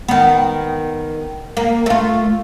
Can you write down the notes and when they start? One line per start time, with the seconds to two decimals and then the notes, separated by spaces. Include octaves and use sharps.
0.08 D#3 B3
1.57 A#3
1.86 A3 F4